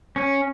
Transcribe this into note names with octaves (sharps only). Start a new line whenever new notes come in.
C#4